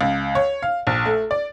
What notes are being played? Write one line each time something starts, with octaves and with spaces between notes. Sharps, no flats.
C#2
C#5
F5
A#1
A3
D5